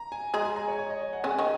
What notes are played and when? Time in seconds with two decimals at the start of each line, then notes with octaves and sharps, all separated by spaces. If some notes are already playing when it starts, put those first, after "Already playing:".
Already playing: A#5
0.12 G#5
0.34 G#3 G#4 A#5
0.45 G#5
0.56 A#5
0.68 C#5
0.79 C#5
0.90 D#5
1.02 D#5
1.13 F#5
1.24 C#3 C#4 G#5
1.38 D#3 D#4